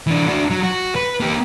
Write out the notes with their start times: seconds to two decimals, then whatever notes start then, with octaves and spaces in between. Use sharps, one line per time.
0.07 E3 D4
0.27 D4 F#4
0.50 F#3
0.63 F#4
0.96 B4
1.20 A#3 G4